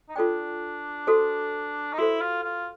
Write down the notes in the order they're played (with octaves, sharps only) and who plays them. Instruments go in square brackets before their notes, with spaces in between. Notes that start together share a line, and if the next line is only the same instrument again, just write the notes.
[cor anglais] D#4
[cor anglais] D4 [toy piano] F4 A4 D5 G5
[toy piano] F#4 A4 C5
[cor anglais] D#4
[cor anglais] E4 [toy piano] F#4 A4 C5
[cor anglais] F4
F4